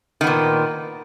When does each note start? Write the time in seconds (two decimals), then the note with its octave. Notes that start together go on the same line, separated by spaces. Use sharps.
0.21 D#3
0.24 B3
0.27 A#2